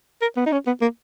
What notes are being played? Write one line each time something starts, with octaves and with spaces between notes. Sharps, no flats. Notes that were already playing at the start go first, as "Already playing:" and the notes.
A#4
B3
D#4
C#4
B3
A#3